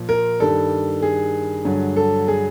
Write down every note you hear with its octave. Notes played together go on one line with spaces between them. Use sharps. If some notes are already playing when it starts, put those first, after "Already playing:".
Already playing: A#2 F3
A#4
G2 D#3 G3 A4
G#4
G2 D3 F#3
A4
G#4